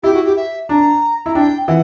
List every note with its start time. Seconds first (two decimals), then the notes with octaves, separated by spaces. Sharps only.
0.03 E4 G4
0.14 F#4
0.25 G4
0.36 E5
0.69 D4 A#5
1.25 E4 A#5
1.35 D4 G5
1.67 E3 F#5